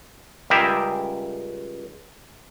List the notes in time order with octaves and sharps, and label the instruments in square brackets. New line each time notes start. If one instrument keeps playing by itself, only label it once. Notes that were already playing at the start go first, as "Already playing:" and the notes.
[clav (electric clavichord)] C#2 G3 G#4 A#4 E5 G5